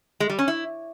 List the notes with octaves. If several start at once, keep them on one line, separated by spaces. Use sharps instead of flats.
G#3
G3
C#4
E4